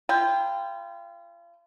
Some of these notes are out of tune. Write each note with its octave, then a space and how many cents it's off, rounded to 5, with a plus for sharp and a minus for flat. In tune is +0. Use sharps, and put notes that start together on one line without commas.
F4 -35 A#4 +45 G5 +10